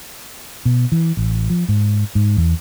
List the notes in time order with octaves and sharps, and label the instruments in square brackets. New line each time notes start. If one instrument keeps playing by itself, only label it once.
[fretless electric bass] B2
E3
A1
F3
G#2
G#2
E2